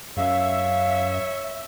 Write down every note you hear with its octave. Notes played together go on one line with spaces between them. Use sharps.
F#2 C#5 E5 F5